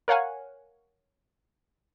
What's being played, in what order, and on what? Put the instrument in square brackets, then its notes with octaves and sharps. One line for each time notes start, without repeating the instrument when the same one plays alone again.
[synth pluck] A#4 C#5 F5 F#5 G#5